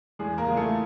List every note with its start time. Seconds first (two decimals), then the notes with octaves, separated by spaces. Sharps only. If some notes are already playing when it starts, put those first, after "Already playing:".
0.19 E2 G#3 G#4
0.38 A#3 A#4
0.48 C#3 F3 G#3 G#4
0.57 A3 A4